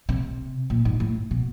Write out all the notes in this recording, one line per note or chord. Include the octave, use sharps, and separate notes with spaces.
C3
A#2
G#2
A2
B2